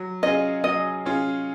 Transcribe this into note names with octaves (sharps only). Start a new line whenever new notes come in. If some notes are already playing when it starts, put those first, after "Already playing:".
Already playing: F#3
C#4 F4 G#4 D#5
F#3 D#5
C#4 F4 G#4